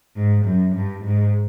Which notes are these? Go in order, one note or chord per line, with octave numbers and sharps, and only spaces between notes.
G#2
F#2
G2
G#2